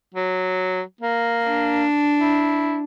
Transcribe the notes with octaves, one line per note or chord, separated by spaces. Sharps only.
F#3
A#3
D4
E4